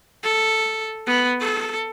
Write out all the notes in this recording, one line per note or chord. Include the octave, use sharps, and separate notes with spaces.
A4
B3
A4